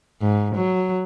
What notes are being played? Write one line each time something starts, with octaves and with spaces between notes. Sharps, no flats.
G#2
F#3